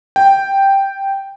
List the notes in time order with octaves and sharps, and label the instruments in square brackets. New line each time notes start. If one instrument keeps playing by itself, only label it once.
[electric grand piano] G5